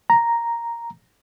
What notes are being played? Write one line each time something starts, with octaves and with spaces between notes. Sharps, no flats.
A#5